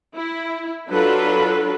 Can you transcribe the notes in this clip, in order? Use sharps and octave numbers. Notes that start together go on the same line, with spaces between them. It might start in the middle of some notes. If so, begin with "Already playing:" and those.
E4
F#3 D4 F4 A4 B4